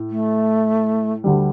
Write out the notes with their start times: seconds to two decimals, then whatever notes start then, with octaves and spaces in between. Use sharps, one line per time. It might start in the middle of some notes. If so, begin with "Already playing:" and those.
Already playing: A2
0.10 A3
1.24 D2 D3 G3